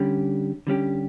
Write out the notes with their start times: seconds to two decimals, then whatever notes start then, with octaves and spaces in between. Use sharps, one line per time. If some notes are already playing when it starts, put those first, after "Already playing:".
Already playing: D3 G3 C#4 G4
0.67 D3 G3 C#4 G4